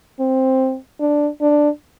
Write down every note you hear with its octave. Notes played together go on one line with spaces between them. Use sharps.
C4
D4
D4